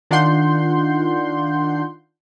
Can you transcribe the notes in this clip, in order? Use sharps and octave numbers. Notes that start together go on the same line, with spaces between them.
D#3 D4 F4 F#5 C6 G6